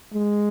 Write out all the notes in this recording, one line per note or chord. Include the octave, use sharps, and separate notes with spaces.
G#3